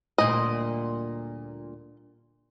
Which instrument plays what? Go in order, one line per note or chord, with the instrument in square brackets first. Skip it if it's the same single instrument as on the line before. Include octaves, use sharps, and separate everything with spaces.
[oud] D2 A#2 G3 [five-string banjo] D#5